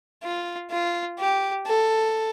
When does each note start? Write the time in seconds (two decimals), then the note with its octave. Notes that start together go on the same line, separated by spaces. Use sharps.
0.24 F4
0.71 F4
1.19 G4
1.67 A4